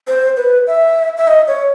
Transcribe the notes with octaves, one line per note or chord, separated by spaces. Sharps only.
C5
B4
E5
E5
D#5
C#5